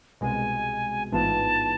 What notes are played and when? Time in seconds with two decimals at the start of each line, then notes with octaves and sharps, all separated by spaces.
0.21 C2 B2 G#3 G#5
1.12 A1 G#2 E3 B3 F4 A5